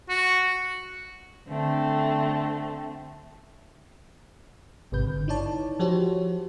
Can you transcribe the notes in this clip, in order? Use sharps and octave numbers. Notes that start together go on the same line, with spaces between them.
F#4
D3 A3 C4
G#1 G2 C3 B4 G6
D3
D#4 E4 C#5 D5 A5
F3 F#4 G4 C5 C#5